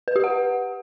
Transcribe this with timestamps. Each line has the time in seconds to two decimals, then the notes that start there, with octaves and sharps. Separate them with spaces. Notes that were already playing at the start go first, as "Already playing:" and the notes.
0.08 B4
0.16 G4
0.24 F#5